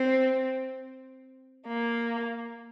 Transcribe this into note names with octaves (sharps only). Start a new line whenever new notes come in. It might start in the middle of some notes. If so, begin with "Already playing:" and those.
Already playing: C4
A#3